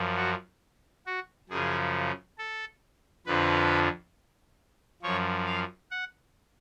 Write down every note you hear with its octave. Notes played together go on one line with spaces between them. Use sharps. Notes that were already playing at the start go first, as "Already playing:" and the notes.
Already playing: F#2 F3
F#4
F#4
F#2 C#3 F3 G#4
A4
F2 D3 F3 B4
F#2 F3 C#5
F5
F#5